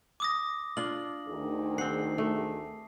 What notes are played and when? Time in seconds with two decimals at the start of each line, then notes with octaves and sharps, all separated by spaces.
0.20 D6 D#6 A#6
0.77 D4 F4 F#7
1.27 D2 D#3 G#4
1.78 C4 F#5 C7
2.18 A3